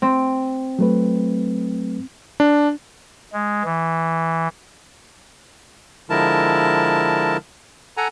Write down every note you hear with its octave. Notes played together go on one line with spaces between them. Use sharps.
C4
F#3 A3 B4
D4
G#3
E3
D3 F3 G#3 E4 A#4 A5
A4 F#5 G#5 A#5